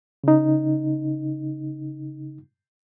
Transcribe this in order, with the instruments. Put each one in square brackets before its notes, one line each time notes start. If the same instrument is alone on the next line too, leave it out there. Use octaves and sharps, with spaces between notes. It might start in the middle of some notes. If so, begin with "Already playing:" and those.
[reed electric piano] C#3 D#4